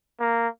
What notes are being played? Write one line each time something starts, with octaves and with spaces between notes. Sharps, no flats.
A#3